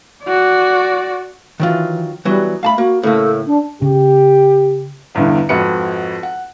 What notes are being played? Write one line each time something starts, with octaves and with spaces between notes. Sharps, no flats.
F#4 D5
D#3 E3 F#3 F4
E3 F#3 G3 B3
A3 F5 A5 B5
A#3 F#4
A2 C#3 A#3 A4
D4
C#3 G4
G1 E2 G2 D3
G#1 F2 F#4 B4 C#7
F#5